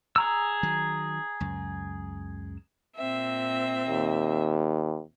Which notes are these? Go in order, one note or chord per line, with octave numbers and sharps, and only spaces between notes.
G#4 A#5 E6
D#3 F#3
C#2 F#2
A#2 C4 E5
D#2